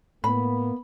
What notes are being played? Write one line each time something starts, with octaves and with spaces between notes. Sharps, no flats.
A2 A#3 B3 B5